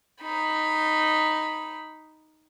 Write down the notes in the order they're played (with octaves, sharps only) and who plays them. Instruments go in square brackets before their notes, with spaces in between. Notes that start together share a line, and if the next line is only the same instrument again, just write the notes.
[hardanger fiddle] D#4 B5